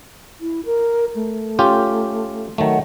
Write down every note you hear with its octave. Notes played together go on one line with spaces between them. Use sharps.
E4
A#4
A3
C#4 F4 G4
D#3 F#3 A3 F#5